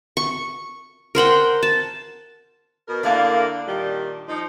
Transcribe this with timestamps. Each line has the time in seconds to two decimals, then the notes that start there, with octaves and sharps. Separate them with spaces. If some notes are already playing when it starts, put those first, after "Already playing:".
0.17 C#6
1.15 A#4 C5 F#5 G5
1.63 A5
2.88 B2 A#4
3.03 D3 A#3 D4 E4 F5
3.68 A#2 D#3 G3
4.28 F3 D#4